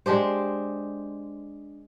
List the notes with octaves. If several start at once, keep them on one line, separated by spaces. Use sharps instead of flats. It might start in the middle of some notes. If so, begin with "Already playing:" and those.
G#3 D4 G4 C5